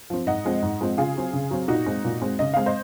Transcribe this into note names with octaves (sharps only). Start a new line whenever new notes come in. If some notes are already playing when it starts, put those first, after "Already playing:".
F3 C4
G#2 D#5 F#5
F3 G#3 C4
G#2
F3 G#3 C4
C#3 F4 G#4
F#3 C4
C#3
F#3 C4
A#2 D#4 F#4
G#3 C4
A#2
G#3 C4
C#3 D#5
G#3 C4 F5
C5 D#5